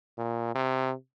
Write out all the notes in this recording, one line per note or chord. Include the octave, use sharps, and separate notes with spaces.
A#2
C3